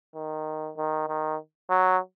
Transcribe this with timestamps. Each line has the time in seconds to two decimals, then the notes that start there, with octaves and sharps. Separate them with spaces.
0.15 D#3
0.77 D#3
1.08 D#3
1.70 F#3